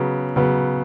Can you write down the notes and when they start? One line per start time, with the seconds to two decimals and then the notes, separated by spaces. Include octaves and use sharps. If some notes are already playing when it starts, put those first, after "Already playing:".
Already playing: C#3 F#3 B3
0.36 C#3 F#3 B3